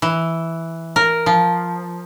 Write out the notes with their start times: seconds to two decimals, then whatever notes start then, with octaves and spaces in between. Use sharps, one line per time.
0.02 E3
0.96 A#4
1.26 F3